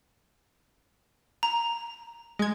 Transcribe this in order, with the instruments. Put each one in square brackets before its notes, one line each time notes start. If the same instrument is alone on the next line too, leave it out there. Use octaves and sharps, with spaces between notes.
[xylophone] A#5
[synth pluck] G#3 G#6